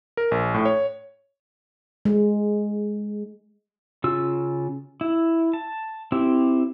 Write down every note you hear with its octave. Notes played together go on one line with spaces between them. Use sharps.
A#4
A#1
A2
C#5
G#3
C#3 F4 E6
E4
A5
C4 E4 G4